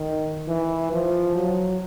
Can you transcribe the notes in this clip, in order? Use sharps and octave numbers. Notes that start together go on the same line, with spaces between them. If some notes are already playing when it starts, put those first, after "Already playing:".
Already playing: D#3
E3
F3
F#3